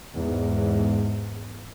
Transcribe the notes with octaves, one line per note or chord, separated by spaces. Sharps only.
E2 G#2